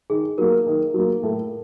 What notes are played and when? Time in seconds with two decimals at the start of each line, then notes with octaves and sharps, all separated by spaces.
0.10 D#3 G#4
0.38 F#3 A#3 A#4
0.66 D#3
0.94 F#3 A#3
1.23 A2